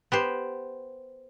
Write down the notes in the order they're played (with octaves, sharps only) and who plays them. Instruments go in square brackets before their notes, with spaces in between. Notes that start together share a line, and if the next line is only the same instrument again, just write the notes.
[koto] B3 G4 C5